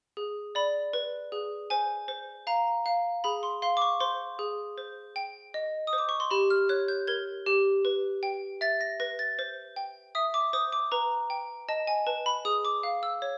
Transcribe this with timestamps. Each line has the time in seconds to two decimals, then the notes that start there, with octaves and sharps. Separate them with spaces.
0.17 G#4
0.55 D5 B5
0.93 B4
1.32 G#4
1.70 C5 G#5
2.08 C5
2.47 F5 A#5
2.86 F5
3.24 G#4 B5
3.43 C6
3.62 F5 C6
3.77 D6
3.82 C#6
4.00 C5 C6
4.39 G#4
4.78 C5
5.16 G5
5.54 D#5
5.87 D#6
5.93 C5
5.98 D6
6.09 C#6
6.20 C6
6.30 G4 B5
6.50 F6
6.69 C#5 F#6
6.88 G6
7.07 A#4 G#6
7.46 G4
7.85 B4
8.23 G5
8.61 E5 A6
8.81 A#6
9.00 B4 A#6
9.19 A6
9.39 C5
9.76 G5
10.15 E5 D#6
10.34 D6
10.53 C5 D#6
10.72 D6
10.92 B4 A#5
11.30 G5
11.69 D#5 A5
11.87 G#5
12.07 B4 A5
12.26 B5
12.45 G#4 D#6
12.65 D6
12.83 F5
13.03 E6
13.22 C#5